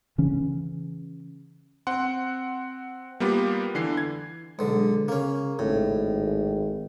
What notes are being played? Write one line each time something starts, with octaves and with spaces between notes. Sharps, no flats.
C#3 E3 C#4
C4 F#5 C6
G3 A#3 B3 F4 G4
D3 E3 C7
G#6
B1 D3 G#3
C#3 A#3 C#4
G#1 A2